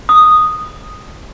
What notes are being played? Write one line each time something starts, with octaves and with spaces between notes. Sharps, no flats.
D#6